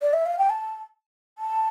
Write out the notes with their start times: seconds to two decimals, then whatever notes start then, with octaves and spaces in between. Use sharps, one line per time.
0.02 D5
0.13 E5
0.26 F5
0.38 G5
0.50 A5
1.38 A5